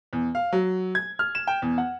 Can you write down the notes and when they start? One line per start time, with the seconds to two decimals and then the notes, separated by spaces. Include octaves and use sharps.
0.13 E2
0.35 F5
0.53 F#3
0.95 G#6
1.19 F6
1.35 E7
1.47 G5
1.62 E2
1.78 F#5